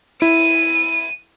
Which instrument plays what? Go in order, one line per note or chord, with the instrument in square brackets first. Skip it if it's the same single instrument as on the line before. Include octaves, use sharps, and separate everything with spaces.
[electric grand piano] E4 [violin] D#7